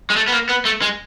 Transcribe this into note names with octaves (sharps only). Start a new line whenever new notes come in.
G#3
A3
B3
A#3
B3
A3
G#3